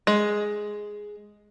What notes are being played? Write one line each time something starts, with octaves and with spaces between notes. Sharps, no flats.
G#3